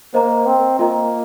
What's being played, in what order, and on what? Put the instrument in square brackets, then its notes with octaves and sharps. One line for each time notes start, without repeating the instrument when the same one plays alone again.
[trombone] A#3 [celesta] C5 D#5 A#5
[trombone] C4
[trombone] A#3 [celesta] F4 A#4 D#5 A#5